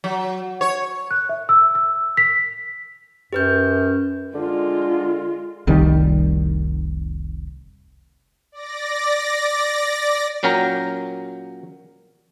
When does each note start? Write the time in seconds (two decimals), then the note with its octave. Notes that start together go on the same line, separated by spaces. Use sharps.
0.04 F#3
0.61 C#5
1.11 F#6
1.29 E5
1.49 E6
1.75 E6
2.17 B6
3.33 F#2 G4 B4 G6
4.34 D3 G#3 F4
5.67 F1 C2 D#3 G3
8.52 D5 A#6
10.43 A#2 F#3 C#4 A#4 G5 A#5